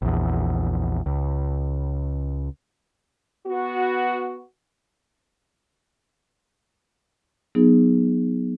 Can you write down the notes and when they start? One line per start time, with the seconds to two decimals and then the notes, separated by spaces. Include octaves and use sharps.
0.02 A#1 E2
1.06 C#2
3.47 B3 F#4
7.55 F#3 B3 D#4 G#4